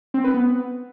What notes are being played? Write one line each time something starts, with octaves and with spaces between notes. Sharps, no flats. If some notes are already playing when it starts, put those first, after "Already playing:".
C4
B4
B3